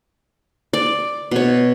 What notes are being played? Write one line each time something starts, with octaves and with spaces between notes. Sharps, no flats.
D5
B2 C#5